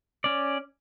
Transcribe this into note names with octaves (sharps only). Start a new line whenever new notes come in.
C#4 D5